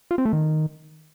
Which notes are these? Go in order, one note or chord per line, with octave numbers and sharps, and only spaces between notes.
F4
C4
A3
D#3